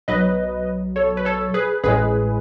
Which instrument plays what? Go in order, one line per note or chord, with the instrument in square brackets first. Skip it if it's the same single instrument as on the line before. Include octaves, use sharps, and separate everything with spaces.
[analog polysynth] B1 B2 F#3 B4 D#5
A4 C#5
B4
A4 C#5
G#4 B4
A1 A2 G#3 G#4 B4